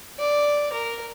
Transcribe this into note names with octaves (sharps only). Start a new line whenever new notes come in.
D5
A#4